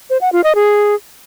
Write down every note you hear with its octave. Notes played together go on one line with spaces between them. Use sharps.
C5
F#5
F4
D#5
G#4